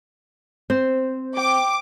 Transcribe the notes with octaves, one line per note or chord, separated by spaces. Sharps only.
C4 C5
G5 D6